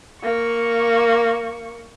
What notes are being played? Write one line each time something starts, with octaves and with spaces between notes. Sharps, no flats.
A#3 C#6